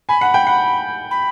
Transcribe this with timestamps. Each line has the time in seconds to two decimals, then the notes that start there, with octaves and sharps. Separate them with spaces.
0.09 G#5 B5
0.21 F#5
0.34 G5
0.47 F#5
1.11 B5